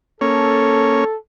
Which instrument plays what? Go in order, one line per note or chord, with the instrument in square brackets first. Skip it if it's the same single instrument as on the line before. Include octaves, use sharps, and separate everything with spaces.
[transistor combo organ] A#3 C#4 C#5 [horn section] A4